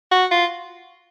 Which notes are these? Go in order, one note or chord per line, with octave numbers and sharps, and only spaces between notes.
F#4
F4